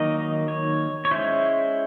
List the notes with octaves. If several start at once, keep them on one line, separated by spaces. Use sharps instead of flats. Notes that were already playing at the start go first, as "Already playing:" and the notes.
Already playing: D#3 F#3 A#3 D#4 D#5
C#5
C#5
G#3 C#4 E4 C5